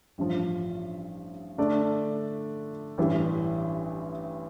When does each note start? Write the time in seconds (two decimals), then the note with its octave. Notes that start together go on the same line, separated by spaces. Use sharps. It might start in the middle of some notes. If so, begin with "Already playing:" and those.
0.18 A1 G2 F3
1.58 D3 A3 D4 A4 D5
2.98 A1 G2 E3 G3